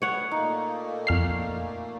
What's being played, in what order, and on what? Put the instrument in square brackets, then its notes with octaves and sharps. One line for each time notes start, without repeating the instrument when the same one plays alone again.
[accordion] G3 A3 B3 [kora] C#5 F#5
[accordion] A#2 A3 A#3 [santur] D#4
[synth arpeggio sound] F2 F6 C7